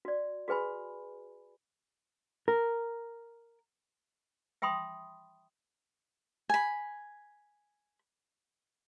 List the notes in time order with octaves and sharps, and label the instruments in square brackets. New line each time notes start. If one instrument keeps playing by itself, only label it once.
[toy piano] F#4 D5
F#4 G#4 B4 G#5 B5
[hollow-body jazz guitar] A#4
[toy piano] E5 G5 B5 C6 D#6
[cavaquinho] G#5 B5